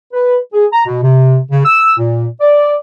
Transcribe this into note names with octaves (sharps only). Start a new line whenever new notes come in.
B4
G#4
A#5
B2
C3
C#3
E6
A#2
D5